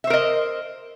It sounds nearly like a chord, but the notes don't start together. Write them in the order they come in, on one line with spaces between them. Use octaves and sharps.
E5 C5 A#4 D#5